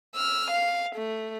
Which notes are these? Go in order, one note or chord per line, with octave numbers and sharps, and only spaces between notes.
E6 F6
F5
A3